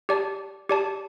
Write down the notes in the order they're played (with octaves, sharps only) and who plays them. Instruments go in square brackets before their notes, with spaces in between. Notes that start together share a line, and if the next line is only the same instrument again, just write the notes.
[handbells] G4 D5 A5
G4 D5 A5